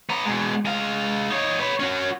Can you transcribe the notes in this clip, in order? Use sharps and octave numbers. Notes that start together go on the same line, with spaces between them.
B3 A#5
B2 G#3
G#3 F5
D#4 C#5
B4 C#5
C#4 F#4